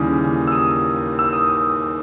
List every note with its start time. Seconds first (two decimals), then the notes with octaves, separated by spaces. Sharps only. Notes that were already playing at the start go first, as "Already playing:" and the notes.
Already playing: D#2 C#3 E3 G3 D#6
0.47 E6
0.52 D#6
1.19 E6
1.33 D#6